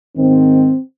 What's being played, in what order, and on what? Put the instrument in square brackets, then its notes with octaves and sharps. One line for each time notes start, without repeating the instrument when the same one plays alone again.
[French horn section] G#2 D#3 C4